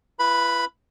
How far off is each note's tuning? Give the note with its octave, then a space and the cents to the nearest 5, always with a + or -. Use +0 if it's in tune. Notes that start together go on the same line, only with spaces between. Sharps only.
E4 +45 B4 +0 B5 +0